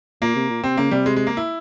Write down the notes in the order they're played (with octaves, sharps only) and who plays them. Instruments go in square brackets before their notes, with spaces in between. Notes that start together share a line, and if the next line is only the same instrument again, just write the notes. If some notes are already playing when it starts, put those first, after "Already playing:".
[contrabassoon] A#2 [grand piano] A#3
[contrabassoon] C3
A#2
[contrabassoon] C3 [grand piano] C4
[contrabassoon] C#3 [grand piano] A#3
[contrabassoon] C3 [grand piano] G3
[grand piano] G#3
G#3
A#3
E4